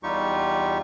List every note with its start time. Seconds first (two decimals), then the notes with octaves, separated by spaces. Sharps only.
0.03 E2 G3 D#4 F4 G4 C#6